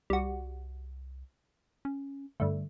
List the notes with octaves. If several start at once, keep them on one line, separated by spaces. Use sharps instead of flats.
C2 G3 F#4
C#4
G2 D3 A3